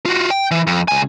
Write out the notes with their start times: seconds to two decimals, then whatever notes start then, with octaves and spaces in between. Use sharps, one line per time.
0.06 F4 F#4
0.31 G5
0.51 E3
0.67 F2
0.88 C#2 G#5